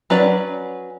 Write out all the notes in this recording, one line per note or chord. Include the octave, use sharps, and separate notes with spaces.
F#3 C#4 B4 D5